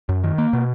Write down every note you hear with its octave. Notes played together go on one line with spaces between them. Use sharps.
F#2
D#3
A#3
B2